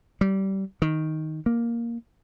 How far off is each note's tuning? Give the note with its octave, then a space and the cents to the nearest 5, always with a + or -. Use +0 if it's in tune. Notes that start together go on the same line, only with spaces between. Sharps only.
G3 -20
D#3 +5
A#3 +5